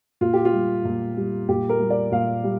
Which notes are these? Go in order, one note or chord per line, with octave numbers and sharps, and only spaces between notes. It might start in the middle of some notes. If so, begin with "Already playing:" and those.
A#2 F4
G4
F4
G3
A#2
G3
A#2 G4
A#4
G3
D5
A#2 F5
G3